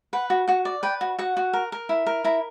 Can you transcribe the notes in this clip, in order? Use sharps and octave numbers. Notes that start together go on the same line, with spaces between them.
B4 F#5
F#4
F#4 F#5
D5
B4 G5
F#4
F#4 F#5
F#4
A#4
A#4
E4
A#4
E4 A#5